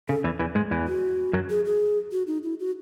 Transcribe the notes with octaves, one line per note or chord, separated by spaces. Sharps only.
C#3 A4
E2 E3
E2 E3
G#2 G#3
E2 E3
F#4
F#2 F#3
G#4
G#4
F#4
D#4
E4
F#4